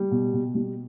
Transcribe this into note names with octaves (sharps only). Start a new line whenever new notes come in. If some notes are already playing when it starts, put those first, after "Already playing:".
Already playing: G3
B2
B2
G3